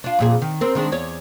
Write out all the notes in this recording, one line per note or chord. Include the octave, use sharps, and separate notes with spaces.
D4 F4
F2 A#2 G#4
D#3
C4 A#4
D#3 G#3 D4
E2 C#5 D5